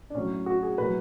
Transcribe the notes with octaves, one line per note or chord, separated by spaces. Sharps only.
D4
A2 F#3 C#4
F#4
G#4
A2 F#3 B4